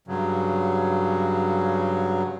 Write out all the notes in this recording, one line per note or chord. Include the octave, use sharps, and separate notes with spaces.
G2 C#3 F#3